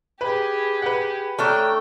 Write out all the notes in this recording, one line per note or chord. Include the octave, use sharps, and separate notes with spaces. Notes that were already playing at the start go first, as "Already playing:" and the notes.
G4 G#4 B4
B4 F#5
A3 C#4 D4 G5 A#5